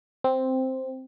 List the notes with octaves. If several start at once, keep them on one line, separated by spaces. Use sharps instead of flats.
C4